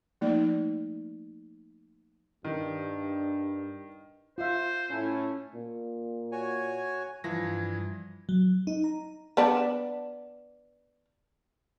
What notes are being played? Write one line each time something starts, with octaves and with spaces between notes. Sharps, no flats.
F3 A3 A#3 D#4 D5
G2 D#3 D4
F4 C5 E5
A2 A3 C#4 E4
A#2
F#4 C#5 G#5
G2 E3 F3 G3 G#6 A#6
F#3
D#4
A#5
B3 D4